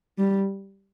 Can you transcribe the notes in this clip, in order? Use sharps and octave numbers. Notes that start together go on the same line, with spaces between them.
G3